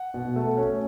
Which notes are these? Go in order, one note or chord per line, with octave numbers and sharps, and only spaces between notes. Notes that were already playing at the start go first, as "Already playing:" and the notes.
Already playing: F#5
B2
A3
C#4